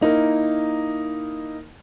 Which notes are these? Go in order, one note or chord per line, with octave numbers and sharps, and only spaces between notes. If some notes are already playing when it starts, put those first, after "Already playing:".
A#3 D#4 E4 A#4